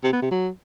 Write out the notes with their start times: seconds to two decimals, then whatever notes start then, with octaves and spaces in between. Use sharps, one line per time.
0.03 C3
0.13 B3
0.22 C3
0.31 F#3